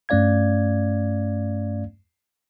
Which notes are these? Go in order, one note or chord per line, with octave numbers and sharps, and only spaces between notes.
G2 A3 C#4 D5 F5 G#6